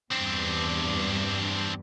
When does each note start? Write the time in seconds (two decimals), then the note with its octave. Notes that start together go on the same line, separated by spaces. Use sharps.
0.12 E2 G2 C4 D4